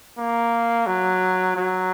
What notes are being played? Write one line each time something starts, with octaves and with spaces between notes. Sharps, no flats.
A#3
F#3
F#3